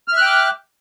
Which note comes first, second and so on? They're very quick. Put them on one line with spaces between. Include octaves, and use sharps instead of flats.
F6 E5 F#6 G5 D6